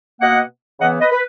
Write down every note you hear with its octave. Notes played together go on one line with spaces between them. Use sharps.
B2 A#3 D#5 F#5
C#3 E3 B3 D#5 F#5
B4 D#5
B4